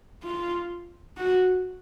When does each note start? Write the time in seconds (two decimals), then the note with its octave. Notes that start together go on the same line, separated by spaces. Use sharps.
0.23 F4
1.17 F#4